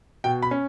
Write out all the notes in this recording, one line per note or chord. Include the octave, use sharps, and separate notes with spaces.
B2 G5
B5
C#4